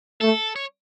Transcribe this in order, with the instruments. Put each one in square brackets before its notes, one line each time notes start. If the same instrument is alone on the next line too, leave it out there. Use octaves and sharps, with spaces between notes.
[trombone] A3 [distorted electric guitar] A4
[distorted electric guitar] C#5